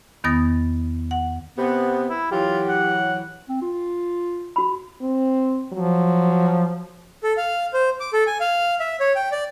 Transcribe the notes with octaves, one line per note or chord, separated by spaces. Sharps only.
E2 D#3 B3 D#6 A6 A#6
F#5
C3 B3
E4
E3 F#3 F4 G4
F#5
C4
F4
F#4 B5
C4
F3 F#3
A4
F5
C5
D6
A4
G#5
F5
E5
C#5
G5
D5